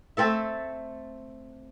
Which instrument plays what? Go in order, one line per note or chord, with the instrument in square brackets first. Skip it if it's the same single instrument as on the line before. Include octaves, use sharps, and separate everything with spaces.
[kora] A3 C4 A4 E5